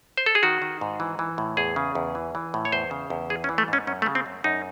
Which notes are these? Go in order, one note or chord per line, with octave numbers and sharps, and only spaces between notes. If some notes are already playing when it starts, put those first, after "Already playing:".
C5
A4
G#4
D#3 F#4
D#3
G#2
E3
E3
A2
E2 G#4
C#3
E2
E3
E3
A2
C#5
E2 C5
C#3
E2
E3 G#4
C#4
E3
A3
G#2 C#4
F#2 C#4
A3
C#3
C4
F#2
F#2 D#4